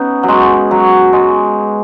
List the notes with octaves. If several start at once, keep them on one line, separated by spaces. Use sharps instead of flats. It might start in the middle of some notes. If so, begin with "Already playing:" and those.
Already playing: B3 C#4 D#4
F#3
G#3
F#3
G#3